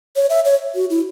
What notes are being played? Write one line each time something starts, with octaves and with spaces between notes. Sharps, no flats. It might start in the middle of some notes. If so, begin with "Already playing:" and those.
C#5
E5
C#5
F#4
E4